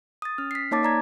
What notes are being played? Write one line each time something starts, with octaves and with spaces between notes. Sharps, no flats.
D#6 A6
C#4 F6
B6 C7
A#3 D#4 C#5 A5 D6 A6
D5 A#5 G#6